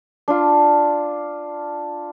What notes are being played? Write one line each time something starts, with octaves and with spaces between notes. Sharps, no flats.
D4 F4